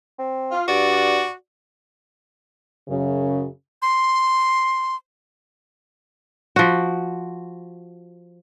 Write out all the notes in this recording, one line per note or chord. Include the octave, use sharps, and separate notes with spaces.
C4
F4
G2 F#4 D5
F#2 C#3
C6
F3 F#4